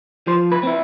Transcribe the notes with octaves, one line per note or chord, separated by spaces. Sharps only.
F3 C5
B4
C4 E4